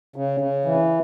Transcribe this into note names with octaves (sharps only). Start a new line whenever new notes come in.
C#3
C#3
E3